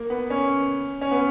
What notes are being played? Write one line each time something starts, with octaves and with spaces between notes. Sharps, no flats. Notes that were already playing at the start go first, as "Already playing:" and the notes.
Already playing: A#3
B3
C#4
C#4
B3